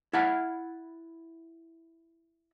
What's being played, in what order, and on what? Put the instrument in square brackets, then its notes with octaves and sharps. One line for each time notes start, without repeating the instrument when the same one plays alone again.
[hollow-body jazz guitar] E4 F#5 A5 B5